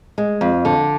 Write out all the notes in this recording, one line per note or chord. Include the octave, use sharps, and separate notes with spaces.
G#3
F2
D3